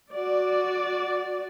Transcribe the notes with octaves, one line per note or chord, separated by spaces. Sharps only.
F#4 D5